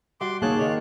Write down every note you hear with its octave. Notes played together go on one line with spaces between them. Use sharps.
G3 F#4 C6 D6
C#3 A#3 D#4 G#4 C#5 A5 F#6
D#3 D4 C#5